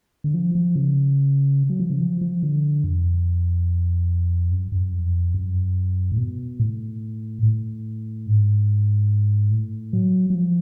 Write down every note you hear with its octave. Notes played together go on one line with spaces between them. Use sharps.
D3
F3
F3
C#3
F#3
F3
C#3
F3
F3
D3
F2
F#2
F#2
F2
F#2
A2
B2
A2
A2
G#2
A2
F#3
F#3
F3